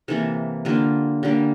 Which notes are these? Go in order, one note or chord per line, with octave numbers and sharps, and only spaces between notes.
C3 E3 A#3 A4
D3 G3 A#3 F4
D3 G3 A#3